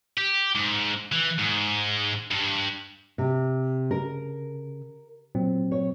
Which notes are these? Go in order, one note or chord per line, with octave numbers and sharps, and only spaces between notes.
G4
G#2
E3
G#2
G2
C3
C#3 A#4
A#2 F#3 C4
C#5